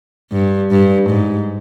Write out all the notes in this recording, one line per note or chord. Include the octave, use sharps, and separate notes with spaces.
G2
G2
G#2